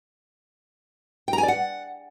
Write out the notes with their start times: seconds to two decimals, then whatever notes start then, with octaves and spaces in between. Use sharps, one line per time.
1.28 G5
1.33 A#5
1.38 G#5
1.43 D5
1.48 F#5